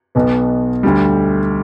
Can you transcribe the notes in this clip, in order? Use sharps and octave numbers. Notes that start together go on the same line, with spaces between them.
B1 B2 B3
D2 D3 G3